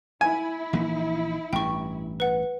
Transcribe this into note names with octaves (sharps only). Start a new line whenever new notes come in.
E4 G#5
A#1 E3 A#3
A1 G2 G5 C#6
B4 F#5